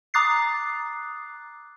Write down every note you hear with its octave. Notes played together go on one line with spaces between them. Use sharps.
A#5 D6 D#6 F#6 A6 C7